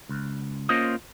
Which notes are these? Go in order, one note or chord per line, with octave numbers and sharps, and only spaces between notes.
C#2
A#3 C#4 F4 C5 D#5